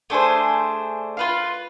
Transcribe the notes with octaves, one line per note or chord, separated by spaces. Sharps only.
A3 D4 G#4 C5
F4 B4 F5